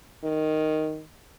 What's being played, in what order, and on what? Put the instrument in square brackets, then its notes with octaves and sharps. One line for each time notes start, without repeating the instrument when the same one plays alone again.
[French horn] D#3